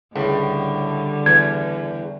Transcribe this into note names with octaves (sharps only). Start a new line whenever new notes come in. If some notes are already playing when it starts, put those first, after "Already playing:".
C#2 A2 D3 G3
E2 G#6